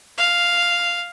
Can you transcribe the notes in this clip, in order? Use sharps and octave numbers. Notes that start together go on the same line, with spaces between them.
F5